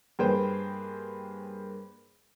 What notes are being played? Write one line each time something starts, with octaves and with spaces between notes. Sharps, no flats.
G2 A#3 G#4 B4 C5 G5